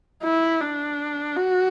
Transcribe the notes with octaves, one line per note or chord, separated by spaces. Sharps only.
E4
D4
F#4